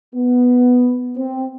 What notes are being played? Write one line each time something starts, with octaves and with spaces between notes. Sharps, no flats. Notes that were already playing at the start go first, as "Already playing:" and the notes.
B3
C4